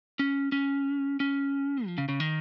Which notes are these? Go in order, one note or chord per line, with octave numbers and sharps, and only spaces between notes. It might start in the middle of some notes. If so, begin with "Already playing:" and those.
C#4
C#4
C#4
F3
C#3
C#3
D#3